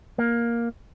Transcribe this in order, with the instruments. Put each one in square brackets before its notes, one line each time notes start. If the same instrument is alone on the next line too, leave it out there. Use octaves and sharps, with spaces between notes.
[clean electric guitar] A#3